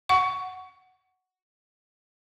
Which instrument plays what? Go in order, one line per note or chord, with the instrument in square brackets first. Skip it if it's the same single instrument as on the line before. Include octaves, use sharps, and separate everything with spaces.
[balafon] F#5 C#6